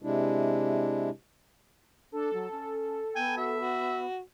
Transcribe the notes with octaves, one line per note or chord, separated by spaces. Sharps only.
C3 G#3 D4 E4
D4 A4
F#3
C#4
B3 G5 G#5
F#4 E5
F#4